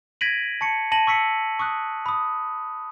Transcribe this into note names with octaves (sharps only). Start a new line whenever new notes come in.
G#6 A#6 B6 D7 D#7 F#7
A5 C#6 C#7
A5 A#6 D#7 F#7
C#6 E6 B6 C#7
C#6 D#6 F#6
B5 D#6